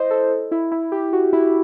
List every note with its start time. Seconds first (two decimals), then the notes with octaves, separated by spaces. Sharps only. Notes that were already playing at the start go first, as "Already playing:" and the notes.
Already playing: E4 C5 D#5
0.11 A4
0.51 E4
0.72 E4
0.92 G4
1.13 F#4
1.33 E4